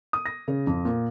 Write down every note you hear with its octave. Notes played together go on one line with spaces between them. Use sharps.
D#6
A#6
C#3
F2
A#2